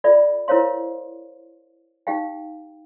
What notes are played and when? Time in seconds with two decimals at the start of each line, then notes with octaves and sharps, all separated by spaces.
0.04 F4 A4 D5 E5 B5
0.48 E4 A#4 C5 C#5 F5 C6
2.07 D#4 G4 F5 G5